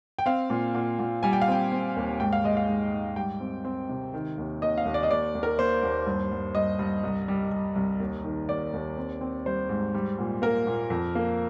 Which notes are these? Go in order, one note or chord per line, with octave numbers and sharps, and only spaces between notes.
G5
C4 F5
A#2
A#2
A#2
G3 G#5
G5
F5
C4 G5
C4
D#2
G#2 G5
F5
G#3 D#5
F5
G#2
G#2
G3 G5
C4
C4
C3
D#3
D#2
D#2 D#5
F5
D#2
D5
D#5
D#2 D5
D#2
A#4
A#3 C5
D#2
G2
G2
G2 D#5
G2
C2
G3
G3
C2
D#2
D#3
D#2 D5
D#2
C4
C4
G3 C5
G#2
G3
A#2
A#3 A#4
A#2
F2
A#3